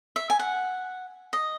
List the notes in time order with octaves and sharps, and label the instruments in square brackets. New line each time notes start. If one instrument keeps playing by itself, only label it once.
[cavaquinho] E5
G#5
F#5
D#5